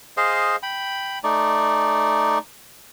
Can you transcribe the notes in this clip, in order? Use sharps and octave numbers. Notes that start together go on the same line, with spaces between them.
G#4 C5 D#5 F5
G5 B5
A3 D#4 D5